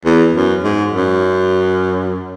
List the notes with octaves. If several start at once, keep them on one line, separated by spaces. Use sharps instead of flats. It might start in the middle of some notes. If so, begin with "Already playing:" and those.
E2
F#2
G#2
F#2